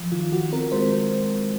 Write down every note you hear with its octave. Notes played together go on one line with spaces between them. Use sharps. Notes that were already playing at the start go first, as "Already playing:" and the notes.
Already playing: F3
D#3 F4
D#3 F#4
C4 A#4
G#3 C5